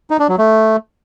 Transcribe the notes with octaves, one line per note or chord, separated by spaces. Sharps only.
D#4
D4
F#3
A3